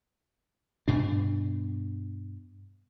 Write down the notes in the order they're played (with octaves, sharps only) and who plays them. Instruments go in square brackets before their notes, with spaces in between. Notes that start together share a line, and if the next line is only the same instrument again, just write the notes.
[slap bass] G2 B2 D4